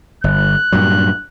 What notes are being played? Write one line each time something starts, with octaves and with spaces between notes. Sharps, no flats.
G1 F#6
G2 A#2 F#3